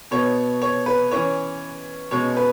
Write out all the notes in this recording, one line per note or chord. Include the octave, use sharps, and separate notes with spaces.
B2 B3 C#5
C#5
B4
E3 C#4 C#5
B2 G#3 C#4 C#5
B4